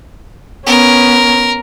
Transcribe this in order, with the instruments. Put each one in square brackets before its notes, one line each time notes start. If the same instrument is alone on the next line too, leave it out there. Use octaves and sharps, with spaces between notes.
[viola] B3 C#4 [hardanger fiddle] A#4